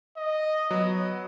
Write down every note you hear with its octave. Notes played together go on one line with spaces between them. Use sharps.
D#5
F#3 B3